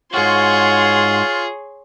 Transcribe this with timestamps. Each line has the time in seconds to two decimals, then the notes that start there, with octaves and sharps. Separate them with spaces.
0.14 G#2 F4 F#4 G#4 C#5 C6